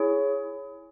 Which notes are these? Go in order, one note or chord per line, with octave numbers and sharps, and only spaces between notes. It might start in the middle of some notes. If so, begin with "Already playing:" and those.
Already playing: E4 G#4 C#5